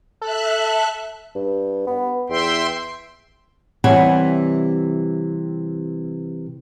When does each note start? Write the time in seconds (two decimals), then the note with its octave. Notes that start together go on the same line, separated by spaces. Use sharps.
0.21 A4 E5 F#6
1.35 G2
1.87 B3
2.30 E2 E5 G5 C6
3.84 C3 E3 G3 C#5 F#5 G#5